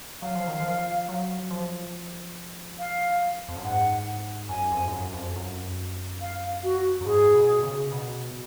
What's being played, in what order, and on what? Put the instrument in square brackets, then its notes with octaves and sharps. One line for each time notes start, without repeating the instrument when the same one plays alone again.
[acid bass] F#3 [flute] F5
[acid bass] F3
D#3
F3
F#3
F3
[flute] F5
[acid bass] F2
F#2
[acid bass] G#2 [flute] F#5
[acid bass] F#2 [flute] G#5
[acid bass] F2
G#2
F#2
F2
F#2
[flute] F5
F#4
[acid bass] F#2
[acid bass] G#2 [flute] G#4
[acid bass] B2
C#3
B2